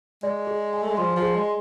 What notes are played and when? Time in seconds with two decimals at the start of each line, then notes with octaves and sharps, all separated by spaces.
0.23 G#3 D5
0.47 G#4
0.73 G#5
0.83 A3
0.91 G#3
0.97 F3 C6
1.16 F3
1.22 G#4
1.35 G#3